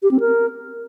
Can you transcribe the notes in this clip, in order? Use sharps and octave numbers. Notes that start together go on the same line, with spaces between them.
G4
C4
A#4